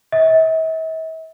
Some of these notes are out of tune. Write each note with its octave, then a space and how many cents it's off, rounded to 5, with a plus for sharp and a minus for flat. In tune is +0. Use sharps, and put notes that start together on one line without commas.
E5 -45